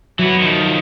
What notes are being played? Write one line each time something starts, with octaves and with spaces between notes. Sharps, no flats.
E3 F#3 B3
D#3 F3